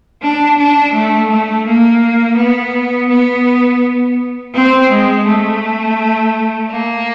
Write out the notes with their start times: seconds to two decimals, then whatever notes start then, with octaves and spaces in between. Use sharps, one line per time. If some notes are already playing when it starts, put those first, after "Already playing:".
0.21 D4
0.57 D4
0.93 A3
1.30 A3
1.66 A#3
2.37 B3
3.09 B3
4.53 C4
4.90 G#3
5.26 A3
6.71 A#3